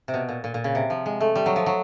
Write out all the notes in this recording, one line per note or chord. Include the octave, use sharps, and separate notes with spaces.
C3
B2
A#2
A#2
A#2
C#3
C3
F3
G#3
A3
G3
F#3
F3
F#3